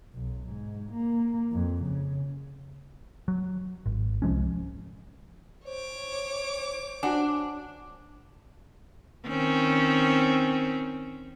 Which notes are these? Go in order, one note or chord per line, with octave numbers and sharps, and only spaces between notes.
B1
G#2
A#3
F2
C#3
F#3
G#1
C2 F3 G#3 C#4
C5 C#5 D6
D4 F#4 F#5 G#5
D#3 C4 C#4